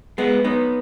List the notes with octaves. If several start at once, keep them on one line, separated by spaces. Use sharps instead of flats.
G#3 B3
B3 D#4